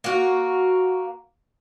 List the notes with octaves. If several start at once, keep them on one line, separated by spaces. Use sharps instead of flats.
A#3 F#4